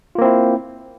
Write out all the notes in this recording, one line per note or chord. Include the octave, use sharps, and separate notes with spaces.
A#3 C4 E4 F4